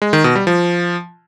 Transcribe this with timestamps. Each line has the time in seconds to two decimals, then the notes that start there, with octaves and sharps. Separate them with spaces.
0.02 G#3
0.13 D#3
0.24 B2
0.35 G3
0.47 F3